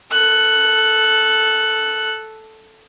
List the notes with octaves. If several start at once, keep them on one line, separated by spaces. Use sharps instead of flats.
A4 F#6